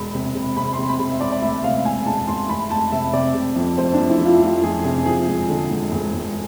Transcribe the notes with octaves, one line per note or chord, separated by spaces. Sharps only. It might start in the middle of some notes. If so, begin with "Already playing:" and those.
Already playing: E1 B5
C3
C3
C3 B5
C6
C3
B5
C3
E5
E1 D5
D5
D2 E5
C3 F5
E1 G#5
E1 A5
E1 C6
F1 B5
F1 A5
C3 E5
C3 D5
C3
F2
F1 C5
D4
F2
E4
F1
F4
F1 F4
F2 G#4
C3 G#4
F3 G#4
E1
D3
E1
E1
E1